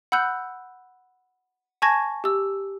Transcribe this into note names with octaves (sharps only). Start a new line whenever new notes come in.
F#5 B5 E6 F#6 G6
G#5 A5 C#6 G#6 A#6
G4 E6